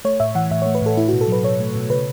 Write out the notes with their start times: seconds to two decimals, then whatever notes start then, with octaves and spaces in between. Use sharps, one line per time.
0.05 A3 C#5
0.20 A2 E5
0.35 E3 F#5
0.51 A2 E5
0.62 C#5
0.66 A3
0.75 B4
0.81 A2 A4
0.97 A3 E4
1.08 F#4
1.13 B2
1.21 A4
1.28 F#3 B4
1.44 B2 C#5
1.60 A3
1.75 B2
1.90 C#3 B4